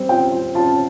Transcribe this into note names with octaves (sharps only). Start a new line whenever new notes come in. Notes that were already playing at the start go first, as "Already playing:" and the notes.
Already playing: G3 C4
F4 G5
F4
F4 A5